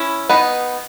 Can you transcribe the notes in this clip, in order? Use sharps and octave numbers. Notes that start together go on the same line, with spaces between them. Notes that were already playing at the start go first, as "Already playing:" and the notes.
Already playing: C#4 E4
B3 D#4